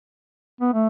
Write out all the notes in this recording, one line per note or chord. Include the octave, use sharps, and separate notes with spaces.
B3
A3